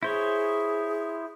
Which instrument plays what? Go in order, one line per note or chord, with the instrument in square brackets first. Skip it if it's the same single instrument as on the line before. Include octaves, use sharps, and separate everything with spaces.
[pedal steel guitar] E4 C5 C#5 [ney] G#4